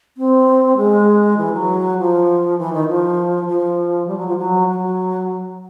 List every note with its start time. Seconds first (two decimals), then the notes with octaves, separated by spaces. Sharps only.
0.17 C4
0.77 G#3
1.37 E3
1.53 F#3
1.98 F3
2.58 E3
2.73 D#3
2.88 F3
3.48 F3
4.07 G3
4.17 F#3
4.28 F3
4.38 F#3
4.68 F#3